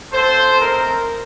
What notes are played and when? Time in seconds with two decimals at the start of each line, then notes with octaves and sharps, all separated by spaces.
0.11 C4 F4 A4 C5
0.59 A3 C4 D#4 A#4